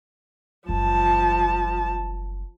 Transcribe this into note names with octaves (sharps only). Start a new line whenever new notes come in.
F#1 F3 G3 A5